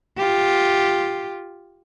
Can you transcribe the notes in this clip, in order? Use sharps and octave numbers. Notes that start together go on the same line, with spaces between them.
F4 G4